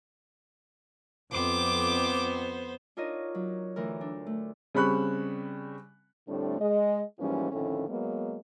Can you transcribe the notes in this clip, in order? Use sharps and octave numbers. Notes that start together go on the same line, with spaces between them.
F2 B3 C5 D6
D4 D#4 F4 A#4 C#5 D#5
F#3
D2 E3 A#4
D4
A3
C#3 G3 C4 B5 C#6 F#6
A2 D3 G3 A3 C4 D4
G#3 D#5
G#2 E3 F3 G3 A#3 C#4
F2 A2 D3 D#3 A3 C#4
F#3 G#3 A#3 B3